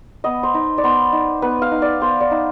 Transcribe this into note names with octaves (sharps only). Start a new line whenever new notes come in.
B3 D#5
C5
D#4
D5
B3 C5
D#4
B3 B4
F5
D#4
D5
B3 C5
D5
D#4